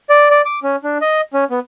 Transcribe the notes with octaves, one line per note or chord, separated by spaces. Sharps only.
D5
D5
D6
C#4
D4
D#5
C#4
B3